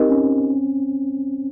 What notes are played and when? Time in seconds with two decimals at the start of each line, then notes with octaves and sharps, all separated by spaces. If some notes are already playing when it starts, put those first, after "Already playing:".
Already playing: C4 D#4 G4 A#4 D#5
0.10 C#4